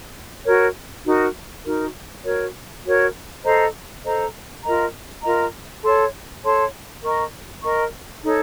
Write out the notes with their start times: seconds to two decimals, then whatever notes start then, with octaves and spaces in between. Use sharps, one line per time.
0.45 F#4 A#4 C#5
1.05 D#4 F#4 A#4
1.65 D#4 F#4 A#4
2.24 F#4 A#4 C#5
2.85 F#4 A#4 C#5
3.44 A4 C5 D#5 A#5
4.04 A4 C5 D#5 A#5
4.63 F4 A#4 D#5 A#5
5.23 F4 A#4 D#5 A#5
5.83 A4 C#5 A5 C6
6.43 A4 C#5 A5 C6
7.03 A#4 D#5 A#5 C#6
7.63 A#4 D#5 A#5 C#6
8.23 D#4 A4 C#5